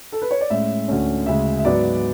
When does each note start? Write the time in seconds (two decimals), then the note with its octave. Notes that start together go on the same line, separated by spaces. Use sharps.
0.12 A4
0.22 B4
0.31 C#5
0.41 D5
0.50 A2 G#3 C#4 E5
0.88 D2 D3 A3 C#4
1.26 D2 C#3 G#3 E5
1.59 E5
1.65 G#2 F#3 B3 D5